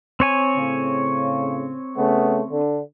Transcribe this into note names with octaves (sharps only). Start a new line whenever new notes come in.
C4 C#5 G#5
A2 C#3
C#3 A3 B3
D3